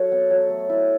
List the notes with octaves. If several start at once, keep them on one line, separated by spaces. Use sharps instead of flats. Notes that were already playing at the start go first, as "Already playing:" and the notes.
Already playing: F#3 A4 C#5
B3
F#3
A3
E4